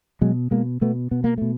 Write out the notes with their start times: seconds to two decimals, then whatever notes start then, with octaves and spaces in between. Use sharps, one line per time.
0.21 B2 F#3 G#3
0.51 B2 G#3 A#3
0.81 B2 A3 B3
1.11 B2 B3
1.24 A#3
1.38 B2 A3